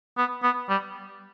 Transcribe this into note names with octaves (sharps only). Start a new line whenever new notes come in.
B3
B3
G3